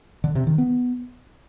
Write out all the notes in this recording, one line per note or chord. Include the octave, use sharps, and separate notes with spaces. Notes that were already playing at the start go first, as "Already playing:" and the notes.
D3
C3
D#3
B3